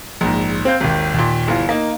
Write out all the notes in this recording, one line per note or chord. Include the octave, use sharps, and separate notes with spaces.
A#1 G#2
C4 F5 G6
G#1 D#2
D#2 A#2
G1 E3 F4
A#3 D#4